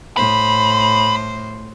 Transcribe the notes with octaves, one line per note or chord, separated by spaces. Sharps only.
A2 C5 B5